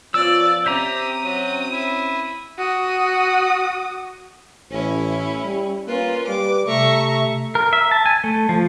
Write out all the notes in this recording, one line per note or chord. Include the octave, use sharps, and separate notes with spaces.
F3 B3 C#4 F4 D5 E6
C4 C#4 G4 C5 E5 A#5 D#6
F#3
E4
F#4 D#6
A1 C#4 E4
G3
A#3 C#4 F4 B4
G3 D6
C3 A3 E5 A#5 C#6
A#4
E5
A5
G#5
A3
F3